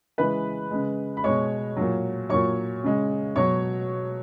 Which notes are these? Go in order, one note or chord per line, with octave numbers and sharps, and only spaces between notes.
C#3 E3 G#3 B4 B5
C#3 G#3
B5
B2 G#3 C#5 C#6
A#2 F#3
A#2 F#3 C#5 C#6
C#3 G#3
B2 F#3 C#5 C#6